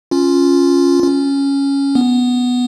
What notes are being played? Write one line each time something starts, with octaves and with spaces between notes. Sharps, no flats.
C#4 F4
C#4
B3